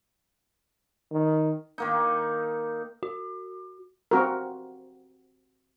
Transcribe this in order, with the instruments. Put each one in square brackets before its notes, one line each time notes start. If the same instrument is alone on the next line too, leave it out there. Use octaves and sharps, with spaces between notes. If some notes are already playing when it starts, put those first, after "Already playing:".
[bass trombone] D#3
[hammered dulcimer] D#3 A#3 D#4
[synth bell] F#4
[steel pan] C4 F#4 A#4